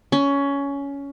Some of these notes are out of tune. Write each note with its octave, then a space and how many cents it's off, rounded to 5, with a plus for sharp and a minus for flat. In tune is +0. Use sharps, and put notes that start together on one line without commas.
C#4 +15